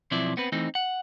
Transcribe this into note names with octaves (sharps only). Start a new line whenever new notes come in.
B1 F3 C4 E4 D5 E5
B3 C4 B4
E3 A3 C4 D#4
F#5